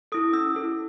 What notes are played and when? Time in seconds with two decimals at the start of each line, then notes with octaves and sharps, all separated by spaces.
0.12 E4 A4 D#6
0.33 C#4 E6
0.55 E4 A4